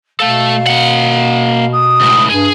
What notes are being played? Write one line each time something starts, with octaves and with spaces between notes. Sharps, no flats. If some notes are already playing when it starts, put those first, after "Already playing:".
B2 A3 A4 F5
A#3 F#5
D#6
C#2 A2
G2 G#4